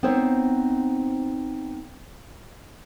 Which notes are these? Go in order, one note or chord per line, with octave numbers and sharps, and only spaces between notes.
B3 C4 D#4 C5 C#5